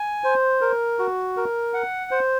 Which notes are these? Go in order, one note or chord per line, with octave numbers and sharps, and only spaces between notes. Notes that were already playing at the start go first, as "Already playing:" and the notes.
Already playing: G#5
C5
A#4
F#4
A#4
F#5
C5